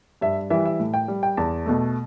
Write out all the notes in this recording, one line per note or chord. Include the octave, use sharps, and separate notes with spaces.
G2 E5
E3 G3 E5
E5
A2
G5
G3
G5
E2 A5
B2 A3